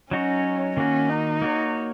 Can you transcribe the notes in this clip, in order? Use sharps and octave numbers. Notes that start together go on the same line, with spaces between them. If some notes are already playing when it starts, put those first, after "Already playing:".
F#3 C#4 D#4 F#4 C#5
D#3 A#3 C#4 F#4
D#4
A#3 F#4 C#5